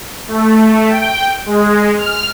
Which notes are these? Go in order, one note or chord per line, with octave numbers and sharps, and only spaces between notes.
A3
G5
G#3
F6